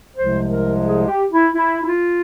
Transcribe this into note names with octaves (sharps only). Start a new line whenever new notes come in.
C2 C3 F3 G#3 C5
A#4
G#4
G4
E4
E4
E4
F4